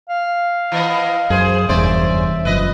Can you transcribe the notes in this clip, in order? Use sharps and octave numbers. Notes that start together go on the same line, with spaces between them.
F5
E3 B3 D#5
F#2 G#4 C5
F1 E2 G2 C#4 C5 D5 E5
F#1 F#2 F3 B4 D#5